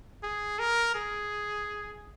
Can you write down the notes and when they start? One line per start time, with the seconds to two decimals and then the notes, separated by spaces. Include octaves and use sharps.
0.23 G#4
0.59 A#4
0.95 G#4